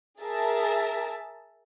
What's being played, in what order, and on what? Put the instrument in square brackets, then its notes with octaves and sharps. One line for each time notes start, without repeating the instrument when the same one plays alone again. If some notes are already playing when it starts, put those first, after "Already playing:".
[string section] G#4 A#4 E5 A5